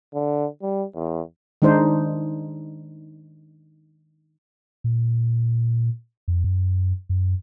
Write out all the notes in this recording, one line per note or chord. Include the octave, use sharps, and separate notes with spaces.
D3
G3
E2
D#3 G#3 D4 D#4 C5
A#2
F2
F#2
F#2